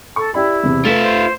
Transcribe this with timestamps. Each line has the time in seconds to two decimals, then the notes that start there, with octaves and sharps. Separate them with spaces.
0.16 A4 C#6
0.34 E4 G4 D5 B5
0.63 E2 C3
0.85 A3 F4 B4 E5
1.02 C5